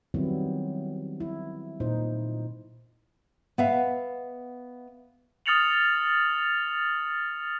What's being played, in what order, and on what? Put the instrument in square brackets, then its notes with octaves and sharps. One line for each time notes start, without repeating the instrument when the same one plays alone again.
[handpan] D#3 F#3 G3 B3 C4 E4
E4
A#2 D#4 C5
[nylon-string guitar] B3 E5 F5
[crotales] D#6 F6 A6 C#7 F7 F#7